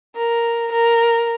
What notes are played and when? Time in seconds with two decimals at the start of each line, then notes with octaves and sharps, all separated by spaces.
0.16 A#4
0.72 A#4